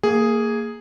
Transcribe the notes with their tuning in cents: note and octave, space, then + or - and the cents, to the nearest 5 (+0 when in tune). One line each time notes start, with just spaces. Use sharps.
A#3 -25 G#4 +0